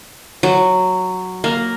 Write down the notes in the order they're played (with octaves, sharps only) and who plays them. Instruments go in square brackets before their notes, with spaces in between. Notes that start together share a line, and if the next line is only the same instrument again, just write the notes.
[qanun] F#3
A#3